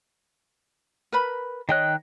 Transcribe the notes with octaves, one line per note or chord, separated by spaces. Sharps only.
A#4 B4 B5
D#3 C#5 D#5 G5 F#6